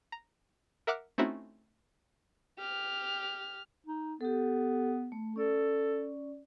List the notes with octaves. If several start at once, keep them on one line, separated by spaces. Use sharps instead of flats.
A#5
A#4 E5 F#5 D6 F6 F#6
A3 C4 C#4 D#4 E4 F#4
G4 F6
D#4
B3 G4 A4
A3
C#4 A4 D5